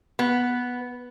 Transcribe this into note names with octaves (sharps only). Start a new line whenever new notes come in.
B3